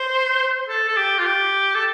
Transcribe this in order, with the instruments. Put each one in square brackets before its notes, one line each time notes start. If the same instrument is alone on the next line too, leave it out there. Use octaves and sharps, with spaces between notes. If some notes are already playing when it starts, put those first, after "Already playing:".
Already playing: [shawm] C5
A4
A4
G4
F4
G4
A4